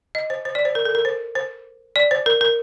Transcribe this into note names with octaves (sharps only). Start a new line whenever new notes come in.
D#5
C5
C5
D5
C5
A#4
A4
A#4
C5
C5
D5
C5
A#4
A#4